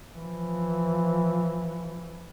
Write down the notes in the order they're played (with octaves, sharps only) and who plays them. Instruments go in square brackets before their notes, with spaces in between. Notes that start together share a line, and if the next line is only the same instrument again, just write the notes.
[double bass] E3 F3